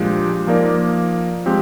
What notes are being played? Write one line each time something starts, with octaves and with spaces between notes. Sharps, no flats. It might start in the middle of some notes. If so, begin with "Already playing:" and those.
Already playing: A#2 F3 G#3 D4 G4
F3 A#3 D#4 A#4 D5
F3 G#3 C4 G4